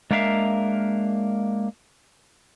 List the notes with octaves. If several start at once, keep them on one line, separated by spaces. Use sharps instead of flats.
G#3 A#3 D4 A#4 E5 F5